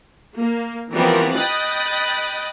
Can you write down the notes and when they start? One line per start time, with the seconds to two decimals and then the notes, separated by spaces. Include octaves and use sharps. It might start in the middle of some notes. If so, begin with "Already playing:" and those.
0.35 A#3
0.91 E3 F3 G3 B3 C4 A#4
1.35 D#5 G5 B5 D#6 F#6 A6